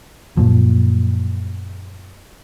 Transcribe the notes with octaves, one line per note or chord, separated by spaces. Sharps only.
F#2 A#2 F3